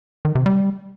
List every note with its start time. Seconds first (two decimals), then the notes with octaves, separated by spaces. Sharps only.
0.25 D#3
0.35 C3
0.46 G3